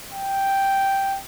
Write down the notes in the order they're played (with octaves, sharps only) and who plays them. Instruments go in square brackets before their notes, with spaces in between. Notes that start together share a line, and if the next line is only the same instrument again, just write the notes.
[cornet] G5